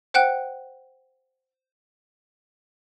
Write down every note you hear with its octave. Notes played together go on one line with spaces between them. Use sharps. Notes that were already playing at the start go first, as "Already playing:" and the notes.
C5 F#5 G5 F#6